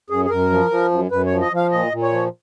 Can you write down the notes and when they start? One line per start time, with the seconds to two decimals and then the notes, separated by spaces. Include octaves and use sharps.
0.10 F#2 G#4
0.25 G#4
0.30 F#2 A#4
0.50 F3
0.71 F3
0.91 F#2
1.11 F#2 B4
1.26 F3 C#5
1.41 D#5
1.52 F3 F5
1.72 A#2 D#5
1.92 A#2
2.03 C#5
2.12 F3